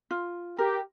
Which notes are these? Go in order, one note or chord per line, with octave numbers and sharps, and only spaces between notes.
F4
G4 A#4